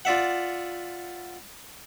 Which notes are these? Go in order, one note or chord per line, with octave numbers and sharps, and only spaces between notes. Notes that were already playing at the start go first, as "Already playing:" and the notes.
F4 D5 E5 F#5